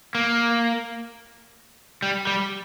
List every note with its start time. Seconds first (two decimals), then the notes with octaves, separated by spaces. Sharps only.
0.15 A#3
2.02 G3
2.27 G3